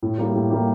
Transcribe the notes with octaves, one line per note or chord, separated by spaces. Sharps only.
A2
G3 A#3 E4 G4
A2
G3 A#3 E4 G4